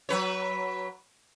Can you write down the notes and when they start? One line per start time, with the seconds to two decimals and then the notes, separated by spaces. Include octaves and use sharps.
0.09 F#3 B4 C#5